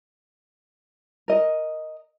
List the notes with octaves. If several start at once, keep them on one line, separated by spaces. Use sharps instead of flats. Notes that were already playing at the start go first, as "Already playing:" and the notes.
A#4 D#5